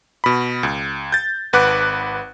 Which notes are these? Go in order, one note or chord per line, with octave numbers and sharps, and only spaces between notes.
B2 B5
C#2
G6 A6
G#1 B4 F#5 D6 F#6